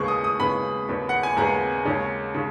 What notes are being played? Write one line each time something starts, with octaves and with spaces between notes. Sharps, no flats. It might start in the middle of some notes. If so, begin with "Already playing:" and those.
Already playing: D#2 C#3 G#3 B3 C#6
D#6
D#6
D#2 C#3 G#3 B3 B5
D#2 C#3 G#3 B3
F#5
G#5
D#2 C#3 G#3 B3 A#5
D#2 C#3 G#3 C#4
C#3